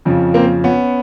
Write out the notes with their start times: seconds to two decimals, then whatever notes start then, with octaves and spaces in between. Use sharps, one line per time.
0.05 F2 C#3 F3
0.34 A#3 C4
0.64 B3 C#4